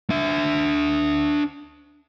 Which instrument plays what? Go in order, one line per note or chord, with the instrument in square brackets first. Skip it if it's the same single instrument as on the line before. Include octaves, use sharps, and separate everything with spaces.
[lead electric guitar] D4 E5